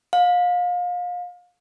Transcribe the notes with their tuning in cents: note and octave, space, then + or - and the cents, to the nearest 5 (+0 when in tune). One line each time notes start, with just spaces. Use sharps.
F5 +30